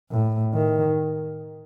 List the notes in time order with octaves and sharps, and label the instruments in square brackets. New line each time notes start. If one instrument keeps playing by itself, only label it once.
[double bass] A2
D#3